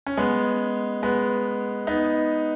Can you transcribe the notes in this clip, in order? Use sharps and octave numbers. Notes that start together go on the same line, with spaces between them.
C#4
G#3 B3
G#3 B3
B3 D#4